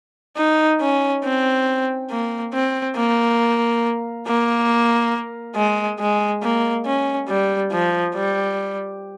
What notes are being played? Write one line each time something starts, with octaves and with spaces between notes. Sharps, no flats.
D#4
C#4
C4
A#3
C4
A#3
A#3
G#3
G#3
A#3
C#4
G3
F3
G3